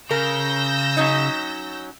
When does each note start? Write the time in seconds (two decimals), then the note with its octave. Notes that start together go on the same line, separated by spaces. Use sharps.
0.11 C#3 A#4 E6 G6 A#6
0.97 F#3 C#4 D#4